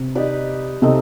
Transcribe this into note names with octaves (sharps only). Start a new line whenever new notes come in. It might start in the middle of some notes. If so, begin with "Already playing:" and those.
Already playing: C3
D#4 G4 B4 D5
C3 A3 C4 D#4